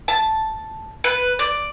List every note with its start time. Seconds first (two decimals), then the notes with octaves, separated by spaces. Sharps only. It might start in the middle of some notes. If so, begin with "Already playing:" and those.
0.08 A5
1.04 B4
1.39 D5